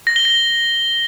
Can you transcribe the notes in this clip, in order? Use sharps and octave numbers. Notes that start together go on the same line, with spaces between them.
A#6
G7
A#6